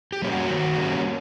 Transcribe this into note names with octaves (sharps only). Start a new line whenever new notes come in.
G4
G3 A#3 C#4
F#4
D#3
G3 A#3 C#4